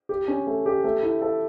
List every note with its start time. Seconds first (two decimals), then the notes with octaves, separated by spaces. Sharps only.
0.09 G4
0.28 C#4
0.47 A3
0.66 G4
0.84 A3
1.03 E4
1.22 A4